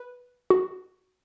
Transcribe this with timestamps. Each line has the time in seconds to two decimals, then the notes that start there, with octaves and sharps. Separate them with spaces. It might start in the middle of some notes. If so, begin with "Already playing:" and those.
Already playing: B4
0.50 F#4